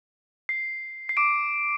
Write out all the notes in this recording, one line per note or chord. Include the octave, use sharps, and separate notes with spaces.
C7
C7
D6 D7